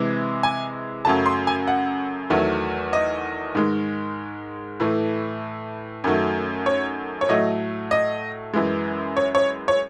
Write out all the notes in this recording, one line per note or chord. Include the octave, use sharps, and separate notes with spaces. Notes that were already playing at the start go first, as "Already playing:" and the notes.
Already playing: C3 E3 G#3
G#5
F#2 C#3 F#3 A3 A5
C6
G#5
F#5
E2 D#3 F#3 A3
D#5
G#2 D#3 G#3
A2 E3 A3
F#2 D#3 F#3 A3
C#5
C#5
A2 F#3 A3 D#5
D#5
F#2 E3 G#3
C#5
C#5
C#5